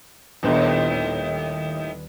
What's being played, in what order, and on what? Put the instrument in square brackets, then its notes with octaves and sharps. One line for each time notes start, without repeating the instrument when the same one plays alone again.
[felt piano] D#1 B3 D4 [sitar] D#2 A2